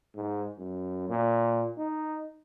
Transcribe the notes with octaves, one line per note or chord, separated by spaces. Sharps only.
G#2
F#2
A#2
D#4